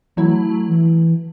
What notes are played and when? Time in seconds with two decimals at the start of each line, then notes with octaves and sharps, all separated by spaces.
0.16 E3 F#3 A3 E4
0.67 E3